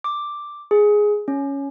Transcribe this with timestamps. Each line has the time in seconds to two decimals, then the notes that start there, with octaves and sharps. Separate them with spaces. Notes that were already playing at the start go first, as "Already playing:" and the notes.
0.04 D6
0.71 G#4
1.28 C#4